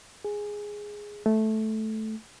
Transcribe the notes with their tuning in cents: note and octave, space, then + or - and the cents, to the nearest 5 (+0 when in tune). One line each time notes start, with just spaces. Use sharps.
G#4 -5
A3 -10